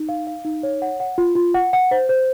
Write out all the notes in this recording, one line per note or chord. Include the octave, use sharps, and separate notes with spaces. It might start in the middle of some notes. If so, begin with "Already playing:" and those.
Already playing: D#4
F5
F5
D#4
C#5
F#5
F#5
F4
F4
F#5
F#5
C5
C5